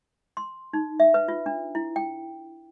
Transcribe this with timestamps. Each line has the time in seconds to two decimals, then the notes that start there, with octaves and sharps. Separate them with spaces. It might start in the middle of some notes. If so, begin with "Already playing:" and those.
0.37 C6
0.73 D#4
1.00 E5
1.14 B4
1.28 F4
1.46 D4
1.75 E4
1.96 G5